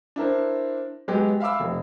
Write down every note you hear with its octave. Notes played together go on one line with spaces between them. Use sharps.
D4 E4 A#4 C5
F#3 G#3 B3 G4
E5 F5 B5 D6 E6
F1